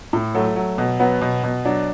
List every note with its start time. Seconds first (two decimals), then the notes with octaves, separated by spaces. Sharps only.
0.13 A2
0.35 F#3 A3
0.56 F#3
0.78 B2
1.00 F#3 B3
1.21 B2
1.44 B2
1.65 F#3 D4